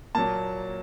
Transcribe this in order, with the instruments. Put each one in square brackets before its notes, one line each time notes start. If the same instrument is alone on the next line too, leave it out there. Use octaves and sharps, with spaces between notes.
[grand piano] A#2 F#3 A#3 A5